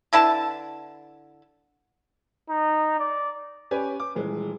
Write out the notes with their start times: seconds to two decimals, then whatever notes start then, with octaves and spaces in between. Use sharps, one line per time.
0.13 D3 E4 B4 A5
2.50 D#4
2.99 D5
3.71 C#4 G4 B4 D5 G#5
4.00 D6
4.15 D#1 E3 G#3